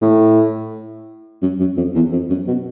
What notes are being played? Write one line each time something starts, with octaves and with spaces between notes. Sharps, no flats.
A2
F#2
F#2
F2
E2
F2
F#2
B2